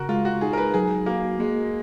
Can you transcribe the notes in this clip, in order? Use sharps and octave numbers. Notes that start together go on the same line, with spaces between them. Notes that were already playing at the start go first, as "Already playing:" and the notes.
Already playing: C#3 F#4 A#4
G#3 F4
F#4
D#4 G#4
A#4
B4
F#3 G#4
A#3 F#4
G#3 A#3